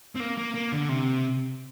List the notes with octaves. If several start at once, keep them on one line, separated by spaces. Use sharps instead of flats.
C4
A#3
A#3
A#3
D3
C3